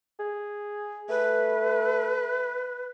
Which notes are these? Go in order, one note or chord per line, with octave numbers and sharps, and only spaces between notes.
G#4
A3 B4